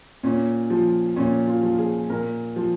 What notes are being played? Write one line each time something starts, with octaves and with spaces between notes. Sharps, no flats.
A#2 C#4
F3
A#2 C#4
F4
F3
G#4
A#2 A#4
F3